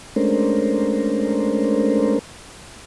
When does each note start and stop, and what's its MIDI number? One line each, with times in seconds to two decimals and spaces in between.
0.16 2.19 56
0.16 2.19 57
0.16 2.19 61
0.16 2.19 62
0.16 2.19 70
0.16 2.19 72